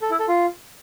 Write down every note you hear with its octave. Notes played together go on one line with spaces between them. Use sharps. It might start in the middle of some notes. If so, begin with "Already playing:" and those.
A4
E4
A4
F4